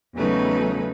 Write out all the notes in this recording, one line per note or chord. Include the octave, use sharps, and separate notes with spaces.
E2 C#3 F#3 A3 D#4 B4